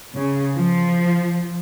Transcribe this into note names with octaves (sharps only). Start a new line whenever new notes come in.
C#3
F3